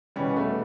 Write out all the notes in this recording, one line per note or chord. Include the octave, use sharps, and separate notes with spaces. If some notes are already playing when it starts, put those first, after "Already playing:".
E2 B2 G3 B3 C#4
A3 B3